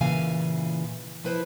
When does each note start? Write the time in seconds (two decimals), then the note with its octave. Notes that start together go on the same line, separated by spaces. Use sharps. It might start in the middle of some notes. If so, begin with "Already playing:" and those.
0.01 A#2 C#3 E3 F5 G#5
1.24 F3 E4 B4 C5